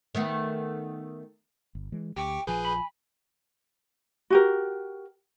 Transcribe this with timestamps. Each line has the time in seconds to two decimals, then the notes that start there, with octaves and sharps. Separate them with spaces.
0.15 D#3 A3 B3
1.75 G1
1.92 E3 G#3
2.17 D2 G4 G5 C#6 D6
2.47 A#1 F3 G#4 B4 G#5 G6
2.65 B5
4.30 F#4 G4 A#4